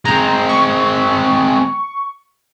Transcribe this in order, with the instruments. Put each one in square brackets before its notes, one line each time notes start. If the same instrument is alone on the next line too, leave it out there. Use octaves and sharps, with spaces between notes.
[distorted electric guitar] G#3 C4 [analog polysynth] A#5 G6
[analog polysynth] C#6